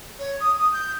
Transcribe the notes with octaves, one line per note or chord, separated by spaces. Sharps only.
C#5
D#6
D#6
G6